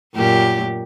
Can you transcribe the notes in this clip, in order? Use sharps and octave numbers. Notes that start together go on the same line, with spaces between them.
F#2 A#2 G4